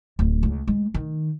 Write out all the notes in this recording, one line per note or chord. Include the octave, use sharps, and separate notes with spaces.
D1
C#2
G#3
D#3